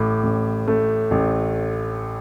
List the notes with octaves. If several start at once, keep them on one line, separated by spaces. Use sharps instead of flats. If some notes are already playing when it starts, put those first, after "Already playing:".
Already playing: A1 A2 D6
A1
A3
A1